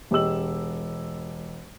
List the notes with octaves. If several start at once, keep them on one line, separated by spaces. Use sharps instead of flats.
E1 G4 D#5 E6 F#7